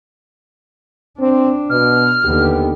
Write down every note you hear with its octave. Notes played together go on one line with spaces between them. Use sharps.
C4 D4
B2 F6
D#2 D3 B3 G4